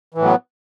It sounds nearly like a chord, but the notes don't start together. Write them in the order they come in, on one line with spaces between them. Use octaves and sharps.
E3 A2 F#3 B3